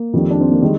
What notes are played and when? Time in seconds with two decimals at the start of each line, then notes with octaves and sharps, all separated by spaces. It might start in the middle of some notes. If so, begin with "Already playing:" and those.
Already playing: A#3
0.13 F2 D#3 G3
0.30 D4
0.40 C4
0.51 A#3
0.62 D#3 G3 G#3